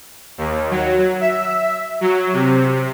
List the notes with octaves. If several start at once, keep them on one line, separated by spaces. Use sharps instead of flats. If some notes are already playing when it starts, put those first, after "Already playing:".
D#2
F#3
E5
F#3
C3